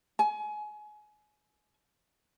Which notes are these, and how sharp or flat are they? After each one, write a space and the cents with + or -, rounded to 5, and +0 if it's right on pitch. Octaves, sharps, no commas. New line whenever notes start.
G#5 +25